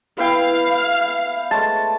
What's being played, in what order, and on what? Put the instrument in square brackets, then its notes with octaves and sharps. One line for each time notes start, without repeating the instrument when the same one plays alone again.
[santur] B3 E4 G5 [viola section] F5
[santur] G#3 A3 C#5 [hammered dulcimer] A5